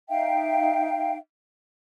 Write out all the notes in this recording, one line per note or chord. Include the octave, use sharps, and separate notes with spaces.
D#4 E5 F5 G5